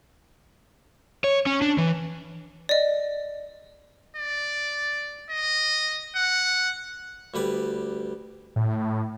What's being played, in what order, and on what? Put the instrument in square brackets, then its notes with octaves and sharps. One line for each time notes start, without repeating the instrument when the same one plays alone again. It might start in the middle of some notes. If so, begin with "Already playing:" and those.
[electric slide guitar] C#5
C#4
D4
E3
[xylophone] D5 D#5
[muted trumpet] D5
D#5
F#5
[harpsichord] D2 G3 B4 D5
[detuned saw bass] A2